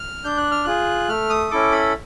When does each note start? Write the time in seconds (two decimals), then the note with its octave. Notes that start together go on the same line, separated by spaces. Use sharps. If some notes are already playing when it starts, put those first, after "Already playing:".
Already playing: F6
0.24 D4 G6
0.38 F#6
0.51 F6
0.64 F4 G#4 F#6
1.09 A3 F6
1.30 D#6
1.51 C#4 E4 A4 D6
1.72 B5